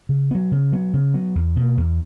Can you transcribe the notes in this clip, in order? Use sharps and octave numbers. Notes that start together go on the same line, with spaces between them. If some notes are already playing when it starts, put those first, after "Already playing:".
C#3
F#3 B3
C#3
F#3 B3
C#3
F#3 B3
E2
B2 A#3
E2